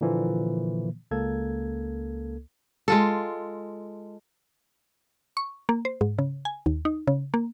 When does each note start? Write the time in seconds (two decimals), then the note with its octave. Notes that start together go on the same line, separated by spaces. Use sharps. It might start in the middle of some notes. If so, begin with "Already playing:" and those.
0.01 A#2 D3 E3 F3 A#3
1.11 C#2 A#3 A4 G#6
2.88 G#3 F4 A4
5.37 C#6
5.69 A#3
5.85 C5
6.01 G#2
6.19 C#3
6.45 G#5
6.66 D#2
6.85 D#4
7.07 C#3
7.34 A#3